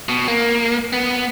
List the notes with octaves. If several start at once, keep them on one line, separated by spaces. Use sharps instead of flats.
B2
A#3
B3